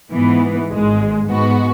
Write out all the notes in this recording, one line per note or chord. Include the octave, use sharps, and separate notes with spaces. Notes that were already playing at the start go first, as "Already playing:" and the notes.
G#2 E3 B3
G#1 G#2 G#3
G#2 G#3 B3 F#4